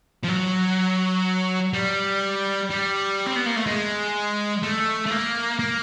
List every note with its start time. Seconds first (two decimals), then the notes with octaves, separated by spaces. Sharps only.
0.24 F3
0.29 F#3
1.73 G3
2.70 G3
3.26 C4
3.36 B3
3.46 A#3
3.56 A3
3.66 G#3
4.63 A3
5.06 A3
5.11 A#3
5.59 A#3